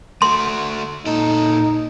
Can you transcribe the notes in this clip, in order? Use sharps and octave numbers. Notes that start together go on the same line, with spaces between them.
A3 F#4 C6
A#2 D#4 A4